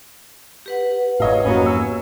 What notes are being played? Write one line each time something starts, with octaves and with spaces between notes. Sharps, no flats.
G4 B4 F#5
G#1 A2 C#5 D#5 F5
F2 G#2 F#3 A#3 B3 C#4
E6